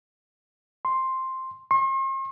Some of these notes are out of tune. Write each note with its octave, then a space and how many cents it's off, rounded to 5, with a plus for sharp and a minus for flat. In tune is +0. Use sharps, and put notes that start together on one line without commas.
C6 +5
C6 +45